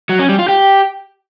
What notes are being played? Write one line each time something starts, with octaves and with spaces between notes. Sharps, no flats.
F#3
C#4
G3
F4
G4